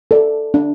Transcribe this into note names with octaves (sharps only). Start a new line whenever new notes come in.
A4 D5
D4